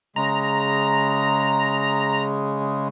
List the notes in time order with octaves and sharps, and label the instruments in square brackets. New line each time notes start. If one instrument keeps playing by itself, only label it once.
[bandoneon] C#3 G#3 [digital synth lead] A#5